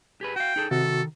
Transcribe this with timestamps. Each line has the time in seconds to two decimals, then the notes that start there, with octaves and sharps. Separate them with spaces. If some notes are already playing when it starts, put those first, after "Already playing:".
0.21 G4 G#4 B4
0.36 F#4 F5 G5
0.56 D#4 G#4 A4
0.71 C3 D#3 F#4 A4